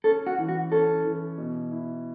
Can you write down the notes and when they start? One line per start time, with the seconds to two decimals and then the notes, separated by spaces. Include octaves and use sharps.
0.04 C#4 A4
0.27 F#4
0.38 E3
0.48 F#4
0.72 C#4 A4
1.04 E3
1.38 B2
1.71 E4